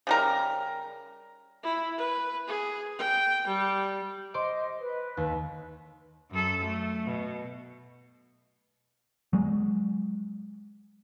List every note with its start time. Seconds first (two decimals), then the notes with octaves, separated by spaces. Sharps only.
0.07 C#3 G3 A#4
1.63 E4
1.98 B4
2.47 G#4
2.99 G5
3.47 G3
4.34 C5 D#5 C6 D6
4.80 B4
5.17 D#2
6.31 F#2 A4
6.65 A3
7.05 B2
9.33 F#3 G#3